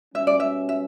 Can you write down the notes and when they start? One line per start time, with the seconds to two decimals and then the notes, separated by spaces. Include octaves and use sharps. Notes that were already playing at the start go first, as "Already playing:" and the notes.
0.14 B2 G3 C#4 E5
0.27 D5
0.40 E5
0.69 E5